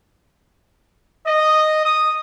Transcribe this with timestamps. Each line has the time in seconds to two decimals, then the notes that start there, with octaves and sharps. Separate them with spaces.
1.27 D#5
1.86 D#6